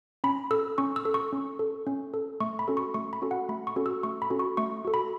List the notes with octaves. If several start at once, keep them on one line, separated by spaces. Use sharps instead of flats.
C#4 B5
A4 E6
C#4 C#6
E6
A4
C#6
C#4
A4
C#4
A4
A3 C#6
B5
C#4 F#4 A4
C#6
A3 C#6
B5
C#4 F#4 A4
F#5
A3 B5
C#6
C#4 F#4 A4
E6
A3 C#6
B5
C#4 F#4 A4
C#6
A3 C#6
F#4 A4
B5